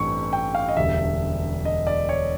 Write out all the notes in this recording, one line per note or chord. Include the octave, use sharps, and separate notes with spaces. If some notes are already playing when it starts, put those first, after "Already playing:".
Already playing: A1 G2 E3 A3 C4 C#6
G5
F5
D#5
E1 D2 D3 G3 E5
D#5
D5
C#5